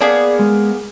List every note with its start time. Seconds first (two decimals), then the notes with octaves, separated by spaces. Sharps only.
0.01 A#3 B3 G#4 D5
0.39 G#3